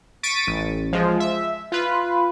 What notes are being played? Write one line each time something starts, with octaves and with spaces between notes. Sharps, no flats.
C#6 A6 B6 D7 D#7
A1
F3 G#3
E5
F4 B4